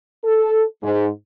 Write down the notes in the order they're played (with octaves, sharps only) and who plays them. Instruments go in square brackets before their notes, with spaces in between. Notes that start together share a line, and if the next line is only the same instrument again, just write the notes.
[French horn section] A4
G#2